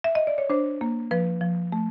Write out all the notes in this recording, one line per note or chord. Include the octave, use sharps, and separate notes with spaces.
E5
D#5
D5
C#5
D4 C5
A#3
F3 B4
F3
A3